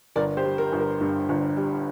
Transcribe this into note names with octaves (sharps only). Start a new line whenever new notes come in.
G1 A#4 D5
G4 C5
G3
A#4
G1
A#4
G2
G1
G3